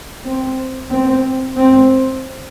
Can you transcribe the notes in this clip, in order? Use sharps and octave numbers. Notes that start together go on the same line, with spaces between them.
C4
C4
C4